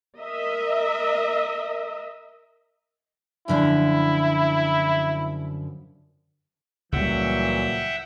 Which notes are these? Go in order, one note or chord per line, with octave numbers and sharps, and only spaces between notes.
A#4 D#5 E5
F#2 D3 F3 E4
C#2 A#2 E3 F#3 G3 E5 F#5 G5